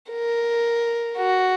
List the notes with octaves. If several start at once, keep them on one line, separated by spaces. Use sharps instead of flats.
A#4
F#4